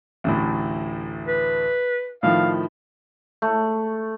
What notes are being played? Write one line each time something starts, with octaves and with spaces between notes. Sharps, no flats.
A1 D2 A2
B4
A2 D#3 F3 F5
A3